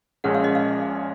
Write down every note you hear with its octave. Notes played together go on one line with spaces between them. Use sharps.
A#1 A#2 G#3 C#4 G#4 F#5
F5
D#5
F5